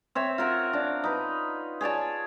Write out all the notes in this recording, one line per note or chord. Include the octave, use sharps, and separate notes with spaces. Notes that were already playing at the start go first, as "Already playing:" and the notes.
C4 C#5 E5
F4 A#4 F#5
D4
D#4 B4
G#4 C#5 D5 A5